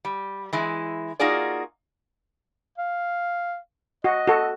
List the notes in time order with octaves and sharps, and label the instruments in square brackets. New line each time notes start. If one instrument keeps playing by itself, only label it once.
[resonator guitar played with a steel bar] G3
E3 G#3 E4
A#3 D#4 F4 F#4 G#4 D5
[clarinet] F5
[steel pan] F#4 [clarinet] D#5
[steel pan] F#4 A4